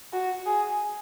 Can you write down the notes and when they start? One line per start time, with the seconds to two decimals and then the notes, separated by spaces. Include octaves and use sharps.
0.13 F#4
0.46 G#4